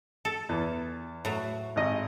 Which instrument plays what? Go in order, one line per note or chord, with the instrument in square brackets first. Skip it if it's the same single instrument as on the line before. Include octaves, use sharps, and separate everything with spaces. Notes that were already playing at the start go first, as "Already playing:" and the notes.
[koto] A4
[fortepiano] E2
[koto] A2 F#3
[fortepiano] G#1 D#5